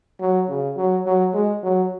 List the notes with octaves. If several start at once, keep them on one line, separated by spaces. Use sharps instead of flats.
F#3
C#3
F#3
F#3
G#3
F#3